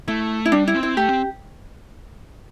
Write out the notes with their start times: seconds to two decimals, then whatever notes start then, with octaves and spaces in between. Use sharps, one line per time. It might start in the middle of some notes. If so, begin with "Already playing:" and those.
0.08 A3 E4
0.46 E4
0.52 G3 D4
0.68 E4
0.74 C4
0.83 E4
0.97 A3 G4
1.09 C4